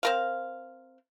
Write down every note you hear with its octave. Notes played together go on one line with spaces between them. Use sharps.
C4 A#4 F5